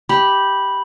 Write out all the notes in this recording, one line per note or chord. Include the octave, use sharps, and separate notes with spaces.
G4 B5 F#7